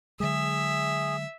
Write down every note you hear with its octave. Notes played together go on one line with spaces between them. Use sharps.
D3 F#3 G#3 G#4 E5